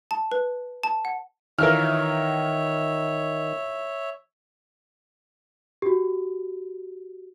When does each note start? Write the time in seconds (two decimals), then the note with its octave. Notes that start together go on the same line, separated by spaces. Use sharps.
0.11 A5
0.32 B4
0.83 A5
1.05 F#5
1.59 D#3 E3 F4 A#4 C#5 E5 F6
5.82 F#4 G4